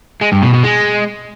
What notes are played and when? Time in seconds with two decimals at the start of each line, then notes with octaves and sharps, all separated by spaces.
0.22 G#3
0.32 G2
0.43 B2
0.53 B2
0.64 G#3